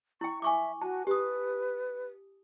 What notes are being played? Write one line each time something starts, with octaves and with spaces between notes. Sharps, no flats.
E4 G5 C#6
E5 G#5 C#6 D6
F#4 A5
G4 B4 D#6